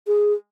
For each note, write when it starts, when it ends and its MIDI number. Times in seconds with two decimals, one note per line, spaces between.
0.07 0.33 68